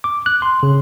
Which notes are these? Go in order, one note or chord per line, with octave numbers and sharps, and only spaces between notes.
D6
F#6
C6
C#3